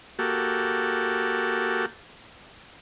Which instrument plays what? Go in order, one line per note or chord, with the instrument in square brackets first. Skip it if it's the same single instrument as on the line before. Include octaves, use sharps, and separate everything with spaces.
[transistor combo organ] A#3 F#4 G4 A4